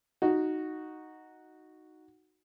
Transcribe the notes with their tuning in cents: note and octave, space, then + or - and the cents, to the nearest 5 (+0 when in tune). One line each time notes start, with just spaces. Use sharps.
D#4 +0 F#4 +0